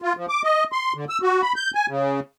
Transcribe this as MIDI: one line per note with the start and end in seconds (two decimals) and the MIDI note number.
0.02 0.13 65
0.17 0.26 53
0.29 0.42 86
0.44 0.64 75
0.72 0.93 84
0.94 1.05 50
1.09 1.18 88
1.22 1.42 66
1.42 1.53 83
1.56 1.71 91
1.75 1.86 80
1.88 2.20 49